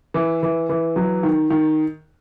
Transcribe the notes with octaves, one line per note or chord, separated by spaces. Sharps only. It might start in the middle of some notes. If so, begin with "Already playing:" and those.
E3
E3
E3
F#3
D#3
D#3